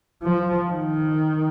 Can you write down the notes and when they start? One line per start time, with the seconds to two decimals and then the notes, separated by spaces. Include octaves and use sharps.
0.23 F3
0.70 D#3